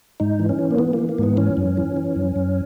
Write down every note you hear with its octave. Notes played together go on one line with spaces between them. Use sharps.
G#2 D#4
E3
C#4
E3
A#3
E3 B3
A#3
E3
A#3
G#2 B3
E3 C#4
F#2
E3
E3
F#2
F#2